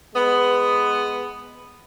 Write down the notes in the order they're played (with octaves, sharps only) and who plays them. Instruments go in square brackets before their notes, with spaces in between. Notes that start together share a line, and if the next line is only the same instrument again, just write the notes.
[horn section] G#3 B3